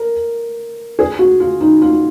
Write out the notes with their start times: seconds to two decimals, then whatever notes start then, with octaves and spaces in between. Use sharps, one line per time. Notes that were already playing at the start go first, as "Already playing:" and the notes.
Already playing: A#4
0.99 G#4
1.19 F#4
1.40 F4
1.61 D#4
1.82 F4